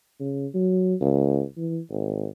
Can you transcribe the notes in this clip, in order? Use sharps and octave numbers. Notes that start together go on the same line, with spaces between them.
C#3
F#3
C#2
E3
G#1